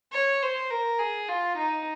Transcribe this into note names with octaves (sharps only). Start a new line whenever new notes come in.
C#5
C5
A#4
G#4
F4
D#4